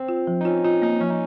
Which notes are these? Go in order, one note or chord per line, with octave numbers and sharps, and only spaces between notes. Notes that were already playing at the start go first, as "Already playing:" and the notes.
Already playing: C4
F4
F3
D#4
C#4 F4
D#4 F4
A#3 D#4
F3 C#4
D#4